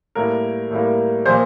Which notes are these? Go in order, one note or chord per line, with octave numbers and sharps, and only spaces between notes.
A2 G3 A#3 A#4
A2 G3 A#3
A#2 F3 A#3 C5